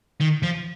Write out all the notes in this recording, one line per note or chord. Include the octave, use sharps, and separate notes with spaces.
D#3
F3